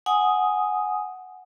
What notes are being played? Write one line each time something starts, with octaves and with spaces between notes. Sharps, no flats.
F#5 G#5 D#6